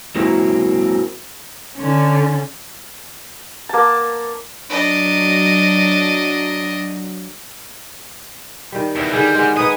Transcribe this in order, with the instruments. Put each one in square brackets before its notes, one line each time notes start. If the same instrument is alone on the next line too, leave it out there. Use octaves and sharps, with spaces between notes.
[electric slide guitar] F#3 G#3 A#3 C4 E4 F#4
[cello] D3 C#4
[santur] A#3 A5
[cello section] F#3 [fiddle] D4 D#5
[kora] D#3 G3
[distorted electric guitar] E2
[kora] D3 D#3 G#4 [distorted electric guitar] G3
[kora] G#3 F#5
[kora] D#4 B4 F#5 [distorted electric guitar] G#5 [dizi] D#6